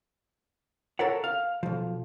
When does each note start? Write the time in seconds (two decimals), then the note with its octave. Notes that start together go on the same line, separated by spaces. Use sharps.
0.99 A4 A#4 C#5 F#5
1.24 F5
1.63 B1 F3